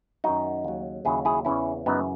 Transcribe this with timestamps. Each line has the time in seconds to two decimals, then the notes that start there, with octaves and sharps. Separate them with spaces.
0.24 F#2 D#3 F#3 D#4 F#4
0.64 D#2 C#3 F#3
1.05 D#2 C#3 F#3 E4 G#4
1.25 E4 G#4
1.45 E2 C#3 E3 C#4 E4
1.86 F#2 C#3 E3 B3 D#4